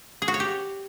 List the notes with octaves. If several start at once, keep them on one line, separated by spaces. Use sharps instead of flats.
G#4
F#4
C#5
G4